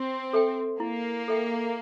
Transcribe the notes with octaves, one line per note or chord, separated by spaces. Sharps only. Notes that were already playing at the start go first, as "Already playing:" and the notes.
Already playing: C4
A4 E5 G5
A#3 E4
A4 E5 G5